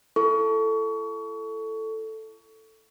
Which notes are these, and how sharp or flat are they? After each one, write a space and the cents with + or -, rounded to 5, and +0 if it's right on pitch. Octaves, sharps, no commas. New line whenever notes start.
E4 +30 A4 +0 C#6 +25